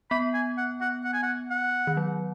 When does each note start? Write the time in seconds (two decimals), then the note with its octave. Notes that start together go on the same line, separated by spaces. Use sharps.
0.11 B3 B5
0.34 G#5
0.57 F#5
0.81 F#5
1.04 F#5
1.13 G#5
1.23 F#5
1.51 F#5
1.87 D#3
1.97 F#3